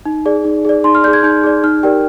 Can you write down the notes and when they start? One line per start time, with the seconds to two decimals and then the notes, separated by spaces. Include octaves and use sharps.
0.06 D#4
0.26 G#4 D5
0.44 D#4
0.65 G#4 D5
0.84 D#4 C6
0.95 F6
1.04 G#4 D5 G6
1.13 G#6
1.23 D#4 G6
1.44 G#4 D5
1.63 D#4 F6
1.83 G4 A#4 D5 G5